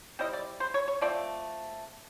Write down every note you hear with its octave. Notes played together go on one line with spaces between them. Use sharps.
G3 C4 E4 D#5
D5
C5
C#5
C#5
F3 A3 C4 D5